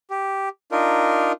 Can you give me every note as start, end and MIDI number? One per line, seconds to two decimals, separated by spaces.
0.10 0.49 67
0.72 1.32 62
0.72 1.32 63
0.72 1.32 65
0.72 1.32 70